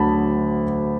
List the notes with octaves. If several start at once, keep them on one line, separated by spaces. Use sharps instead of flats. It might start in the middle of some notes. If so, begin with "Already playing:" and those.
Already playing: D2 D3 F#3 A5 B5